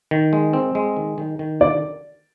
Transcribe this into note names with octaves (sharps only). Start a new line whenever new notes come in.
D#3
G#3
C4
G#3
D#3
D#3
D#3
D3 D5